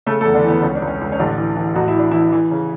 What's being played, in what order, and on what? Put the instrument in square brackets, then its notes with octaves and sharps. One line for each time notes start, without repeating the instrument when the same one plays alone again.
[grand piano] C#3 A3 A4
A3 A4
E2
D3 D4
E3 B3
C#2 C#4
D4
C#2
C#4
C#2
C#4
A1 D3 D4
E3
E3
A1 F#4
E4
E3 D4
E3 E4
E3
C#3